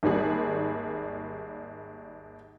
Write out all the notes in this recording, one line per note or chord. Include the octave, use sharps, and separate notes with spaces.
G#1 D#2 G3 G#4